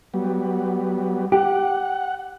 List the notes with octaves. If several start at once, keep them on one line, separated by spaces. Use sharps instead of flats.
F#3 G3 B3
G4 F#5